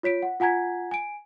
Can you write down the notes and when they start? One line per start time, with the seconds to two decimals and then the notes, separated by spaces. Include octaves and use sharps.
0.03 F4 C#5 B6 D7
0.22 F#5
0.40 F4 F#5 G#5 A#5 G#6 B6
0.91 G#5 D7